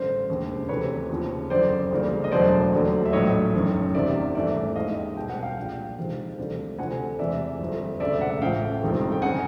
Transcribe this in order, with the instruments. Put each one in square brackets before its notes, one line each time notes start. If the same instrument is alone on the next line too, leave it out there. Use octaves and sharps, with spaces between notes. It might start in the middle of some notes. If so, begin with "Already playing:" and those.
Already playing: [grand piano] A1 G2 D3 A#4 C5
E1 D#2 C#3
D2 C3 E3 B4 C#5
D#2 C#3 F3
F#1 F2 D3 C5 D5
D2 C#3 E3 G3 A#3
D#5
E1 E2 B2 F#3 A3 C5 D5
D#2 D3 F#3 A3
E5
A#1 A2 F#3 C#5 D#5
F#1 F#2 D#3
E2 C3 D#3 G3 A#3 D5 E5
G#1 G2 E3 A3 D5 E5
D#2 D#3 G#3 D#5 F5
C2 B2 G#3 G5
F#5
F5 G5
A#1 A#2 G3
F2 C3 D#3 G#3
D2 C3 E3 G3
D2 C3 F3 A3 F#5 G#5
E2 C3 E3 G#3 D5 E5
G1 F2 C3
E1 D2 C#3 D5 E5
E5 F#5
A1 A2 F3 F5 G5
G1 F2 C3 D#3 G#3
G5
C#3 F#5 G#5